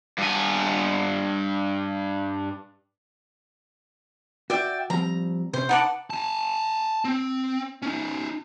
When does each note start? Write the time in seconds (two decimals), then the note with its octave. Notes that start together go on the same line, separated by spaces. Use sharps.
0.18 G2 G#5
4.50 F#4 D5 E5 G5
4.90 F3 G3 C4 A#5
5.53 C3 C#4 C5
5.69 D#4 B4 F#5 A5 D6
6.10 G#5 A5
7.05 C4
7.82 C#4 D#4